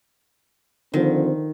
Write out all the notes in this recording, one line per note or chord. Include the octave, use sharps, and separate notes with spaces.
D3 D#3 F3 C4